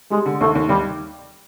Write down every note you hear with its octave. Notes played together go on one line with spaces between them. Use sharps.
G3 G#3
D3
D#2 A3
D#2
D#2 G3